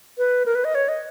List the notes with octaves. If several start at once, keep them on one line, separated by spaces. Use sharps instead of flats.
B4
A#4
B4
D#5
C#5
D#5